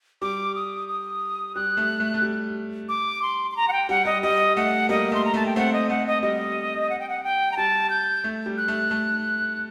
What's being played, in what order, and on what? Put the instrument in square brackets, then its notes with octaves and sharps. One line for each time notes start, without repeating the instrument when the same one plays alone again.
[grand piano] G3 [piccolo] D6
[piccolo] D#6
D#6
[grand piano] G3 [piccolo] F#6
[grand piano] A3
A3
A3
G3
[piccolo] D6
C6
C6
A#5
F#5
G5
[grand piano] G3 [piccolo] F#5
[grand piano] G3 [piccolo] D#5
[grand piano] G3 [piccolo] D#5
[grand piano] A3 [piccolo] F#5
[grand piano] G3 A#3 [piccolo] D#5
[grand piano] A3 [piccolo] C6
[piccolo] A#5
[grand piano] A3 [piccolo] A5
[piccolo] G5
[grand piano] A3 C4 [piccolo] F#5
[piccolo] D#5
[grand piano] A3 [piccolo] F#5
[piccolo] D#5
[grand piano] G3 [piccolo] D#5
[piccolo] F#5
G5
F#5
G5
A#5
[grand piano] G3 [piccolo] A5
[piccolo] G6
[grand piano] A3
G3
[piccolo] F#6
[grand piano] A3
A3